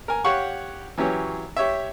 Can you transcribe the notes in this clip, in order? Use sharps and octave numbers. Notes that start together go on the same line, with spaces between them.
A#4 G#5
G4 C#5 F5 F#5 C#6
E3 F#3 C#4 G4
G4 C#5 E5